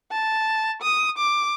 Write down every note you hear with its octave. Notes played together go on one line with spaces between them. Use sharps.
A5
D#6
D6